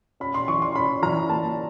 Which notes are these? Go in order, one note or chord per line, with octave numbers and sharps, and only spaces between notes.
C#4 B5
C6
E3 C#6
C6
C#4 B5
E3 A#5
A#3 A5